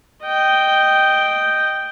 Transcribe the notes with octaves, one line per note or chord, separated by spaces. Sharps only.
D#5 G5